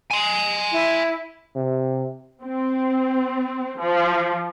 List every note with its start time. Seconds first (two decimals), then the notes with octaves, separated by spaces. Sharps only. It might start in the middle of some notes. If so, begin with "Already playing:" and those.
0.11 G#5 C6
0.72 E4
1.55 C3
2.43 C4
3.79 F3